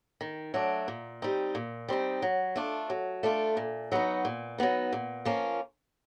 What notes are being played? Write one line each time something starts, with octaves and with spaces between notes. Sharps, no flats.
D#3
F#3 A3 D4
A#2
G3 C4 D#4
A#2
G3 C4 D#4
F#3
A3 D4 F4
F#3
A3 D4 F4
A#2
F#3 B3 D#4
A#2
F#3 B3 D#4
A#2
F3 A#3 C#4 F4